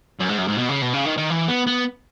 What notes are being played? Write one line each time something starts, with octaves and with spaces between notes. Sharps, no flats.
F#2
G#2
F#2
G#2
B2
C#3
B2
C#3
D#3
D#3
E3
B3
B3